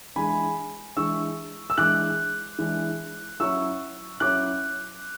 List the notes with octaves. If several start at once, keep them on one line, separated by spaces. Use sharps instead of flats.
E3 G#3 D4 G#5 B5
E3 G#3 D4 C#6 E6
E6
E3 G#3 D4 D6 F#6
E3 G#3 D4
F#3 C#4 E4 C#6 E6
F#3 C#4 E4 D6 F#6